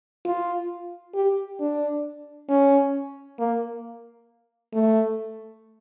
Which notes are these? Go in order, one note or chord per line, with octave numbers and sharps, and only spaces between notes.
F4
G4
D4
C#4
A#3
A3